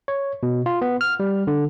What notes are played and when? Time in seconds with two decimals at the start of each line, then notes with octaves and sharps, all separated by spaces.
0.08 C#5
0.43 B2
0.66 F4
0.82 B3
1.01 F6
1.20 G3
1.47 D3